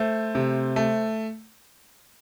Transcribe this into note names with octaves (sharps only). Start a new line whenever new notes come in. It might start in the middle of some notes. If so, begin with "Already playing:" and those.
Already playing: A3 C5
C3
A3